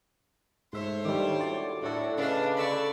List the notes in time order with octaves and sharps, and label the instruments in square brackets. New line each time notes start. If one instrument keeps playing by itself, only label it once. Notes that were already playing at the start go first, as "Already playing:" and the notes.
[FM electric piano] G#2 E5 [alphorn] A3 [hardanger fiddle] C5 C#5
[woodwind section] D#2 A2 D6 [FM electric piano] D#3 G3 [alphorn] D4
[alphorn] F#4 [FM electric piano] D5
[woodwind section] A2 [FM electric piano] A3 A4 [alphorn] D4 [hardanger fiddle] F#4
[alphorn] C#3 [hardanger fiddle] D4 D#5 [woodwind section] B4 F5
[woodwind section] D3 [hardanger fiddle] D5 C#6 [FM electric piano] B5 E6